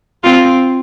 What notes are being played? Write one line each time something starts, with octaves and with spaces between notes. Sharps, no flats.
C4 F4